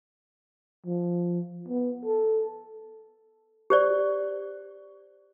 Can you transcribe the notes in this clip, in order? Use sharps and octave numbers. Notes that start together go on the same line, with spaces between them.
F3
B3
A4
G4 C5 D5